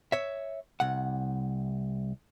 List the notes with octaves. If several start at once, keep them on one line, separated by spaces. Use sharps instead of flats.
C#5 E5
C2 F#5